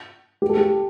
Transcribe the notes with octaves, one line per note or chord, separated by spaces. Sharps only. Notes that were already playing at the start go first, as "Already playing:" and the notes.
G4
A4
G4